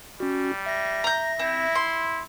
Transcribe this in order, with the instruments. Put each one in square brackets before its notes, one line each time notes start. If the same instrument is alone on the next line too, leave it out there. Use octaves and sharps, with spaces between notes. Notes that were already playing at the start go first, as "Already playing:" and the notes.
[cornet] G3 [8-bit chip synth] C#4 F#4
[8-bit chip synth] E5 A#6
[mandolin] A#5 G6
[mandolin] C4 [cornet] E4
[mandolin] C6